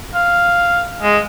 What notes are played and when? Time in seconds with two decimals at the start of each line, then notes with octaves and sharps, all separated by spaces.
0.15 F5
1.03 G#3